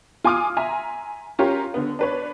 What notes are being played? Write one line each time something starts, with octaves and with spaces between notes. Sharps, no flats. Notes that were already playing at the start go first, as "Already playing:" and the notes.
F4 G#5 C6 D6 D#6 F6
E5 G#5 A#5 C6
C#4 F4 G4 A#4 C#5
D3 B3
D4 B4 C#5